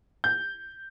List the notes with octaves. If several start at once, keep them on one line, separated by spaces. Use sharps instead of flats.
G6